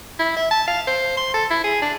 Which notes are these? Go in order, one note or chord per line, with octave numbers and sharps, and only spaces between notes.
E4
E5
A5
F5
C5
C6
A4
E4
G#4
D4